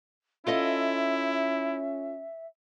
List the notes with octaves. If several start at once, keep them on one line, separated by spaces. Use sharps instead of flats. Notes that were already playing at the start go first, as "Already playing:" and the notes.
C#4 E4 F4 A4 D#5 E5